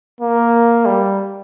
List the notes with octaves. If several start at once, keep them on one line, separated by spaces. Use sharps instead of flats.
A#3
G3